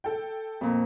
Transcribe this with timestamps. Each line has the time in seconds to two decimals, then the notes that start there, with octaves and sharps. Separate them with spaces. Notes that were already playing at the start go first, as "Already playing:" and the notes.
0.04 A4 G5
0.61 F2 A#2